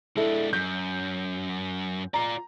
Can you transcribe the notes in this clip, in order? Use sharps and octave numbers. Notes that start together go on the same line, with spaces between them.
G#3 D4 E4 A4
F#2 G6
F4 D5 A#5